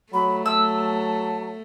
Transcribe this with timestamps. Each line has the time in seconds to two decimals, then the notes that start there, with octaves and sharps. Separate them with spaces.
0.13 F#3 A3 B5
0.46 F#3 A5 E6